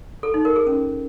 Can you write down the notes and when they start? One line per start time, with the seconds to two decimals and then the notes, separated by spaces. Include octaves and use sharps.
0.23 A4
0.34 D#4
0.45 A#4
0.56 G#4
0.67 C#4